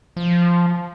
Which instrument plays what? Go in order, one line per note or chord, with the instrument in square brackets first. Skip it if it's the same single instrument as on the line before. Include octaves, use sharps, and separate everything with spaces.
[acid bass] F3